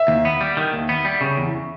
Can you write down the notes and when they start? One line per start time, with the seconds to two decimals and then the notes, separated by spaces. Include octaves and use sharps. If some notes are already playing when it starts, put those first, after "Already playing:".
Already playing: E5
0.08 D#2
0.25 B3
0.41 G3
0.57 D#3
0.73 D#2
0.89 B3
1.05 G3
1.21 C#3
1.37 E2